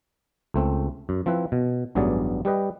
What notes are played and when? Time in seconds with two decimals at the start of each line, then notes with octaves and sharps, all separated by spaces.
0.54 C#2 A3 C4
1.09 F#2
1.26 F3 C4 E4 B4
1.52 B2
1.95 A1 G2 F#3 B3 G#4 D5
2.45 G3 G4 B4 D#5